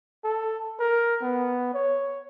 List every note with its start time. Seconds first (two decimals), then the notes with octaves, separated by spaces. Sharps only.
0.24 A4
0.79 A#4
1.22 B3
1.74 C#5